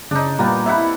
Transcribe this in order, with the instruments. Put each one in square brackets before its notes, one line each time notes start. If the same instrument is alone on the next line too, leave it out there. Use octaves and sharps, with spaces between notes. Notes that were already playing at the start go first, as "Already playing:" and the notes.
[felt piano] C#3 [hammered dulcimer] D4 D#4
[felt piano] A#2 G3 A#5 [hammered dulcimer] A#3 B3
[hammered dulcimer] C3 E4 F#5 [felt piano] E5 B5